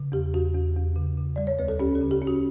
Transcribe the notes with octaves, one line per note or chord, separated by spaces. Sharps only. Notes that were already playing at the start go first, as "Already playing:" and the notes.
Already playing: C#3
E2 G4
E2 F#4
E2
E2
C#3
C#3
G3 D5
C#5
D2 B4
A4
C#4 G4
A4
C#3
G4
C#4
F#4